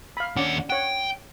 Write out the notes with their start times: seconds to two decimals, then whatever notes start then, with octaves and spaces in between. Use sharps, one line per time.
0.17 F5 B5
0.36 D#2 C#4 D4 D5 F#5
0.70 C#5 F#5 G5